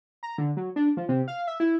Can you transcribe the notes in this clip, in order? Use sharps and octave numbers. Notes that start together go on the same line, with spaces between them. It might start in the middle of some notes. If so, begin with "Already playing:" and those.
A#5
D3
F#3
D4
F3
C3
F5
E5
E4